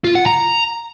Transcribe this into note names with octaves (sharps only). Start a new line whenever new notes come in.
F4
F#5
A#5